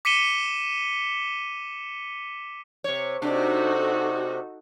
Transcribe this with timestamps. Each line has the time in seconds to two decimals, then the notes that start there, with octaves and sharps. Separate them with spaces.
0.05 D6 B6 C#7 D#7 E7 G7
2.84 C3 C#5
3.22 C3 D4 D#4 F#4 A4